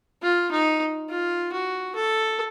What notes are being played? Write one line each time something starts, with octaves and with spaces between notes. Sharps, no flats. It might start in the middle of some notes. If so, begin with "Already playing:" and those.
F4
D#4
F4
F#4
A4